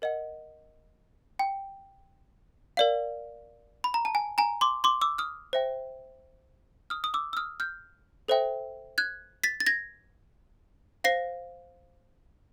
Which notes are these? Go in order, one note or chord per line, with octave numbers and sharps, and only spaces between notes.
A#4 D#5 F#5
G5
A#4 D5 F5
B5
A#5
A5
G#5
G#5 A#5
C6 D6
C6 D6
D6 E6
D#6 F6
C5 E5 G5
D#6 F6
D#6
D6 E6
E6
D#6 F6
F6 G6
A4 C5 E5 G5
F#6 G#6
A6 B6
A6
G#6 A#6
C5 F5 A#6 C7